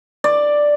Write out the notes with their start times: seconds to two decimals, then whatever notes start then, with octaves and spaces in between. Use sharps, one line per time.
0.24 D5